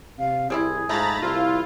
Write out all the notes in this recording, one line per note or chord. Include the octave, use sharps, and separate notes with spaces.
C3 F5
C2 G3 C4 E4 G#4
G#2 F3 A3 A#5 B5 A6
C2 E4 F4